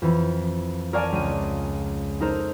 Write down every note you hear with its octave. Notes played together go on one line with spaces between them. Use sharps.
F2 E3
A#4 C#5 D5 F5 G#5 A5
C#2 D#7
D#4 A4 A#4 C5